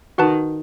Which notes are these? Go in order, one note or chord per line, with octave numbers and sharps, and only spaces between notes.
D#3 F#4 B4 F#5 A5